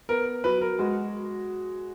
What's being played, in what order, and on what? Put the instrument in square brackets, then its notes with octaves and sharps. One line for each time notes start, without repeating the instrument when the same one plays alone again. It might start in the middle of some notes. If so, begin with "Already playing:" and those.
[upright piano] B3 [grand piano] A#4
[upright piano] F#3 [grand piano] B4
[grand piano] A#4
[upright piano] G#3 [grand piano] F#4